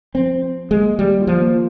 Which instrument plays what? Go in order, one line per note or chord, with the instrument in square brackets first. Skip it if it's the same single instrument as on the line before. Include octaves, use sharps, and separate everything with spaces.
[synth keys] F3 [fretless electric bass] C4
[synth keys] F3
F3
[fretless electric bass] G#3
[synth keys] A#3
[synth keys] D#3 [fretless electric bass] G3
[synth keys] F4
[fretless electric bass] F3
[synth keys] A#3